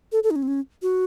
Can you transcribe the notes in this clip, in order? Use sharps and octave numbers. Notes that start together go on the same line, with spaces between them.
A4
A4
D#4
C#4
C4
C#4
F#4